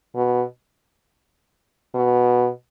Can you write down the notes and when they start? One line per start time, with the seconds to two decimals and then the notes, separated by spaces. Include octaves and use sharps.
0.16 B2
1.95 B2